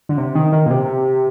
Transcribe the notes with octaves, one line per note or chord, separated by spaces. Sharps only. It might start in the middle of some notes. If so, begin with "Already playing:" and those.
D3
C3
D#3
D#3
A#2
C3